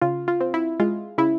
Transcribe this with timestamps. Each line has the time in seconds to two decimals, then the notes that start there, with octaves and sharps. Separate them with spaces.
0.02 C#3 F4
0.28 F4
0.41 C4
0.54 E4
0.80 G#3 F4
1.18 C#3 E4